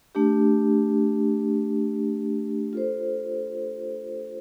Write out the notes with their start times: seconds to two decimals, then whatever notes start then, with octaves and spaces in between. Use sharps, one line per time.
0.15 A3 D4 G4
2.73 F4 A4 C5